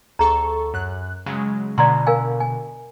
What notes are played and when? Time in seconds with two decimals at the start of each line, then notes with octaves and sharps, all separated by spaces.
0.19 D2 G#4 A4 A#5 C#6
0.74 F#2 F#6
1.26 C#3 F#3 G#3
1.78 B2 D3 D5 A#5 C6
2.07 A#4 F5 G#5
2.40 G#5